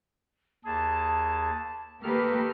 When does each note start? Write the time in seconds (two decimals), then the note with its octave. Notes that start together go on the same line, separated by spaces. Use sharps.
0.65 D#2 G#4 A5
2.03 D#3 A#3 G4 A4 B4 F6